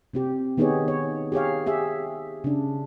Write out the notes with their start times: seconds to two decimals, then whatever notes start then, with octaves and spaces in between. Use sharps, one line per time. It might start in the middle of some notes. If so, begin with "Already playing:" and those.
0.13 C3 C4 G4
0.57 D#3 B3 D#4 G4 G#4 C#5
0.88 C#5
1.32 G4 G#4 C#5 F5
1.66 G4 G#4 E5
2.44 C#3 D4